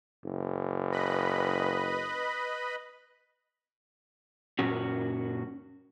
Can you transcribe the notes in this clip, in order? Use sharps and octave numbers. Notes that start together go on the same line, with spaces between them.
F#1
B4 D#5 B5
F#2 A#2 C#4 F#4